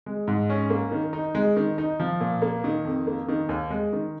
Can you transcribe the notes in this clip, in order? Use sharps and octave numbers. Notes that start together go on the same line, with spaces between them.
G#3
G#2
C#4
A#3
D#3
D#4
G#3
D#3
D#4
F3
A#2
A#3
D#3
F2
A#3
D#3
D#2
G#3
D#3